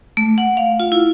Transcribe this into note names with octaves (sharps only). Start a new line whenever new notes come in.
A3
F#5
F5
F4
E4